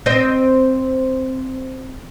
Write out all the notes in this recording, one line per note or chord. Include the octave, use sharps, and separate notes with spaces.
C4 C5 D#5